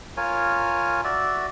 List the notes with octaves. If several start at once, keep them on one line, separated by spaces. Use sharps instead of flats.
F4 A#4 C#5 G#5
F#4 D5 E5